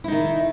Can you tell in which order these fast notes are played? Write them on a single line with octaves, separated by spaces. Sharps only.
E4 D#4 D#3